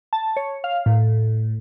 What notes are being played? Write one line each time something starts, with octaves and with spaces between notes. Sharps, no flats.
A5
C#5
F5
A2